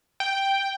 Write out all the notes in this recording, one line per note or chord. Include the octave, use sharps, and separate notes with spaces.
G5